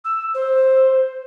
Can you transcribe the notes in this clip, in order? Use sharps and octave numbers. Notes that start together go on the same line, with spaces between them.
E6
C5